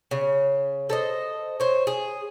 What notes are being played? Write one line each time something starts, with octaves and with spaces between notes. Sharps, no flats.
C#3
A4 C5 D#5
C5 C#5
G#4